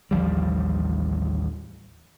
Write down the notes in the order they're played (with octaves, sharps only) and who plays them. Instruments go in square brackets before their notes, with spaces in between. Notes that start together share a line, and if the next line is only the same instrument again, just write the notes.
[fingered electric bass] A1 D#2 F3 G3